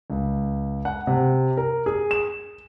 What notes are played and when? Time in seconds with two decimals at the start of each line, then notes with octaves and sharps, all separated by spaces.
0.10 C#2
0.85 F#5
1.07 C3
1.57 A#4
1.86 G#4
2.11 E7